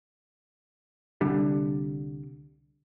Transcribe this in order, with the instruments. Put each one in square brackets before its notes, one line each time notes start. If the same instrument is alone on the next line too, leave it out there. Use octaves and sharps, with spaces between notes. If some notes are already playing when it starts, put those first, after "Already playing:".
[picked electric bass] C2 D3 G3